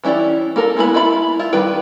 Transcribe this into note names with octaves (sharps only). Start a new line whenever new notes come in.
E3 C#4 E4 G4 D5
A#3 A4 A#4
G#3 B3 E4 G#4 B5
E4 F4 E5 B5
E4 F4
D#3 G3 B4 G5